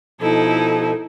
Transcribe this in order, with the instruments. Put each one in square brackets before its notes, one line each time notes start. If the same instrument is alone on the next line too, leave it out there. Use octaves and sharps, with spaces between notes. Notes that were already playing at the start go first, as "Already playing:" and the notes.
[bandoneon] B2 F3 [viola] D#4 E4 [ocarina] A4